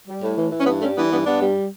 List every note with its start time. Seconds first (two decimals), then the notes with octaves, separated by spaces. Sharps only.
0.08 G3
0.22 A2
0.37 E3
0.52 E3
0.61 C#4
0.66 G2 B3
0.82 G3 A3 C#4
0.97 E3 B3 D4
1.12 G2 B3 D4
1.26 G2 B3 D4
1.41 G3